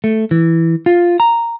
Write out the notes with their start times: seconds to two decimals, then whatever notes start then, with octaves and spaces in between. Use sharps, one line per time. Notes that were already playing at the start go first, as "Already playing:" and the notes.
0.04 A3
0.31 E3
0.86 F4
1.20 A#5